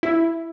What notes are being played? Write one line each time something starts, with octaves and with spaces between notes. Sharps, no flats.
E4